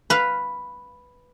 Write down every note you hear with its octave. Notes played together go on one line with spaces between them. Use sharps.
B4 F5